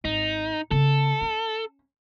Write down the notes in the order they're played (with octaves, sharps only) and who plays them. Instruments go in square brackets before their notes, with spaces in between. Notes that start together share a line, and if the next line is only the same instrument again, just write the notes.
[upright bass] G#1 [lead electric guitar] D#4
[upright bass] C#3 B3 [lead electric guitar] A4
[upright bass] C#4